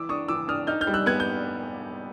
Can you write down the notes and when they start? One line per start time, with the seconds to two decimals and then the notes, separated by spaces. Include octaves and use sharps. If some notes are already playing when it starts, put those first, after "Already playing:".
Already playing: E3 D6 E6
0.09 D4 C#6 D#6
0.28 E3 D6 E6
0.48 D4 D#6 F6
0.67 D#4 F6 G6
0.81 F6 G6
0.87 G3
0.94 E6 F#6
1.06 B3 F#6 G#6
1.20 G6